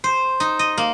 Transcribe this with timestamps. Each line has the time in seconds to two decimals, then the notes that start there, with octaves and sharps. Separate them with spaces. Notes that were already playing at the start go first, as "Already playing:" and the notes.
0.04 C5
0.40 D#4
0.59 D#5
0.78 A#3